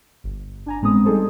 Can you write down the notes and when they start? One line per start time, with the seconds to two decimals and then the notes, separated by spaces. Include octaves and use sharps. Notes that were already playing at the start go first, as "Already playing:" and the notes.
0.24 G1
0.66 D4 G#5 A#5
0.82 A2 G#3 B3 C4 D#6
1.05 G3 D#4 G#4 A4 C5